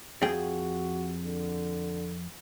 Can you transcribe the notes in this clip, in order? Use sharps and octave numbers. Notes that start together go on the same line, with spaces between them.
F2 F#4 G#4 G5
D3